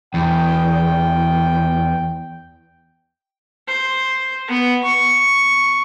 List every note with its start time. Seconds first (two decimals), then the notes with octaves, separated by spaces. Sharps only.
0.14 E2 G5
3.67 C5
4.48 B3
4.83 C#6